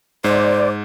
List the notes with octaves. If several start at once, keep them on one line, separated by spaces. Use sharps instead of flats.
G#2 C5 D5